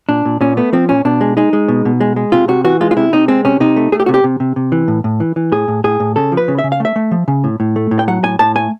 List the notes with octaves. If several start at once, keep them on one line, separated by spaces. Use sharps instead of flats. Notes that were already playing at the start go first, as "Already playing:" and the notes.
A#2 D4
A#2
A#2 C#4
A3 B3
F3 C4
A#2 C#4
B2 D4
G#3
G#3 D#4
G#3
B2
B2
G#3
G#3
C3 F4
C3 F#4
E3 F#4
G#3 F4
F4
C3 E4
C3 D#4
G#3 C4
C3 C#4
C3 D#4
A3
A3 G#4
G4
C3 F#4
G4
C3
C3
C3
E3
A2
A2
E3
E3
A2 G#4
A2
A2 G#4
A2
C#3 A4
F3
B4
C#3
E5
C#3
F5
A3 E5
A3
F3
C#3
A2
A2
A3
A2
G5
F#3 F#5
A2 G#5
A2 A5
A3 G#5